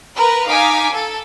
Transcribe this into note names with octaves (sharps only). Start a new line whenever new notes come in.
A#4 B4
D#4 F5 G#5 D6 B6
A4